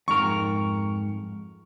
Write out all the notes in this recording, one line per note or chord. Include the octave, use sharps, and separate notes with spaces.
F2 G#2 A#4 C#6